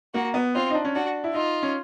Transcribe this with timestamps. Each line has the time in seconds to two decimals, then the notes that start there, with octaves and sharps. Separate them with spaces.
0.14 A#3 F#4
0.34 B3
0.55 C4 F4
0.70 D#4
0.75 D4
0.85 C#4
0.95 D4 F#4
1.24 E4
1.34 D#4 F4
1.63 C#4